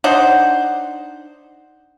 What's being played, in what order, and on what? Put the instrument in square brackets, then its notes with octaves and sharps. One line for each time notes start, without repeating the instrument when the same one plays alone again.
[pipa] D4 D#4 C5 F#5